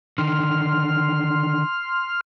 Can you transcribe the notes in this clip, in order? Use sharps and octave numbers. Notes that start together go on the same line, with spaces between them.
D3 D#3 C6 F6